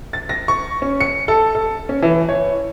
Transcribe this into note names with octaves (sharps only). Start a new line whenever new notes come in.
A6
A#6
C#6
C#4
C#7
A4
A4
C#4
E3
C#5